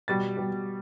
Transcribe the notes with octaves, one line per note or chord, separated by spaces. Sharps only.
B2 G3 A6
B2 G3